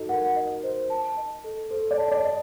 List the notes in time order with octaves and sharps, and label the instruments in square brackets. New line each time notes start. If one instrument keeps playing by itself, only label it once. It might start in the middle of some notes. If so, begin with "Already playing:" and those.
Already playing: [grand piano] D#4 F#4 A4
[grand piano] A#4 [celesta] F#5
[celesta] D#5
C5
A5
D#5
A4
[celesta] A4 [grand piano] C5
[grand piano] D5
[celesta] A5
[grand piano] D5
[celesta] D#5